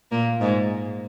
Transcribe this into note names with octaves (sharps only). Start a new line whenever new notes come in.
A#2 A#3
G#2 G#3